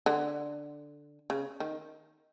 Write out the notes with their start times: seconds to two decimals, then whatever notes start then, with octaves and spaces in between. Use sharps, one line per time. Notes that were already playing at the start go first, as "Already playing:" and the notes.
0.06 D3
1.30 C#3
1.60 D#3